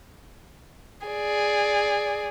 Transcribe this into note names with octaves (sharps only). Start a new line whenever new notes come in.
G#4 D5